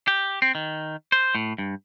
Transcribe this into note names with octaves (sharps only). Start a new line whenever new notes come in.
G4
C4
D#3
C5
A2
G2